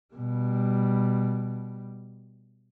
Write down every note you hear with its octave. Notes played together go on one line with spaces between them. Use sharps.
B2 G3